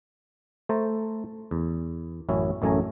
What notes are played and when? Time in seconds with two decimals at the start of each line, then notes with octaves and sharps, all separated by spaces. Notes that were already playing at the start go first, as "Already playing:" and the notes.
0.69 A3 C5 A5 A#5
1.51 E2
2.29 A1 F#2 C#4 E4
2.62 A1 F#2 A3 C#4 G#5 A#5